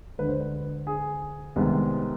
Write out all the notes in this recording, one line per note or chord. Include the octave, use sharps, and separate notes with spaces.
D2 D3 G#3 B4
C5
B4
G#4
C2 C3 D#3 G#3 B3